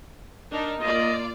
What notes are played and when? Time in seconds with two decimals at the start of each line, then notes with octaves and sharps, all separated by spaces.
0.51 D4 D#4 A#4
0.80 A#3 F4 D5 D#5